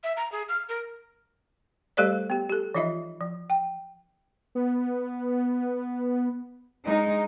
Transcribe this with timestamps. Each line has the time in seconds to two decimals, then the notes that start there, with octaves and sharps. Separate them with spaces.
0.04 E5
0.17 A#5
0.32 G#4
0.49 F6
0.69 A#4
1.97 G3 A3 G4 A4 C5 D5
2.30 B3 G4
2.49 G4 A4
2.74 E3 F3 D#4 F4 D#5 E5
3.21 F3
3.50 G5
4.55 B3
6.85 G#3 D#4